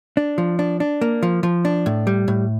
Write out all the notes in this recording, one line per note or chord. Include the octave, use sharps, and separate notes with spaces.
D4
F3
D4
D4
A#3
F3
F3
D4
A2
G3
A2